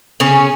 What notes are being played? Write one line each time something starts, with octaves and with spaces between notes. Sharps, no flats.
C#3 C#4